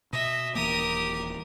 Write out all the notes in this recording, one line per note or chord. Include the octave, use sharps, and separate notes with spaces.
B2 D#5 E5
D#1 E3 A#3 G4 A#4 D#6